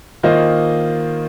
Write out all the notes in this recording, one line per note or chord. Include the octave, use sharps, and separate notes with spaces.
D#3 A#3 F4 C5 D#5